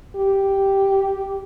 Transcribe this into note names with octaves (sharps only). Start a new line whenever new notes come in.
G4